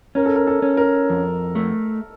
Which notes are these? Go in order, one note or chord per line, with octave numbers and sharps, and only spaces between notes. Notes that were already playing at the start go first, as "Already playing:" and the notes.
C#4 A#4
A4
A#4
A4
C#4
A#4
F2
A3